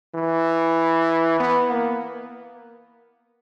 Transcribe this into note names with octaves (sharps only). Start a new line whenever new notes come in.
E3
B3
A#3